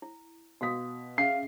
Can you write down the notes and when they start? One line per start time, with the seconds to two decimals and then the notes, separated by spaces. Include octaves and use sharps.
0.02 E4
0.61 B2 F#4 F5 D#6 B6
1.18 C#4 G#4 E5 F5 C7